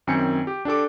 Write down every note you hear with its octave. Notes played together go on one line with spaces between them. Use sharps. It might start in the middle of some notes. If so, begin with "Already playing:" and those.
F#2 D#3 C4 G#5 G6 C#7
G4
D4 G4 A4 D6